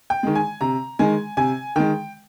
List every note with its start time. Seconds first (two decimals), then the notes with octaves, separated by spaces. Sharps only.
0.10 G5
0.23 D#3 G#3
0.35 G#5
0.61 C3 A#5
0.99 D#3 G#3 G#5
1.37 C3 G#5
1.76 D#3 G#3 G5